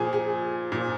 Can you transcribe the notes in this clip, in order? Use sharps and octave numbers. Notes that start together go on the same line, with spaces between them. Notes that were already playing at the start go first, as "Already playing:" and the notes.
Already playing: A#2 F3 G#4
G#4
A#2 F3